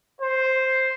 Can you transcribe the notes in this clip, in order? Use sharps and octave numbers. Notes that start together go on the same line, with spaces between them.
C5